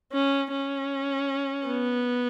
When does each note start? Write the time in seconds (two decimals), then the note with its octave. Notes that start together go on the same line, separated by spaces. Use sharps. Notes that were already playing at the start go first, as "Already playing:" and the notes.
0.13 C#4
0.51 C#4
1.67 B3